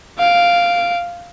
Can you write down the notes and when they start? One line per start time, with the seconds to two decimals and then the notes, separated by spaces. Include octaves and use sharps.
0.18 F5 D7